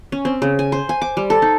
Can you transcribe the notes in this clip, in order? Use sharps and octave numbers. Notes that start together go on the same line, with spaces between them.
C#4
C4
C#3
G#5
C5
G#5
D6
G3
A4
D#4